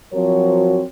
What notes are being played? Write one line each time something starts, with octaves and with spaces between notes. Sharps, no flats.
F3 F#3 C4 F#4 A#4 C#5